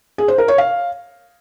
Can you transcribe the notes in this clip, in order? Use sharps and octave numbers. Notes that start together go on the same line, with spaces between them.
G#4
C5
A#4
C#5
F5